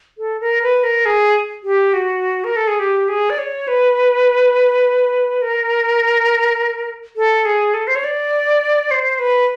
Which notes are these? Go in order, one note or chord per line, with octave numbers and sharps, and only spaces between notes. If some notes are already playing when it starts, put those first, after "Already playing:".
A4
A#4
B4
A#4
G#4
G4
F#4
A#4
A4
G#4
G4
G#4
D5
C#5
B4
A#4
A4
G#4
A4
C5
C#5
D5
C5
B4